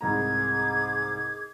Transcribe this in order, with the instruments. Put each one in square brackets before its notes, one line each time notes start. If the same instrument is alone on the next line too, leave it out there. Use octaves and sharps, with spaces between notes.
[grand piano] C2 G#2 A#5 [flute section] G#4 D6 G#6